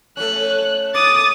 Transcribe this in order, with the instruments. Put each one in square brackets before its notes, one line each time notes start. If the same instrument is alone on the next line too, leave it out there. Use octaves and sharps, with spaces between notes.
[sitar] A3 C#4 [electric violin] F#6
[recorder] D6 [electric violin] D#6 A6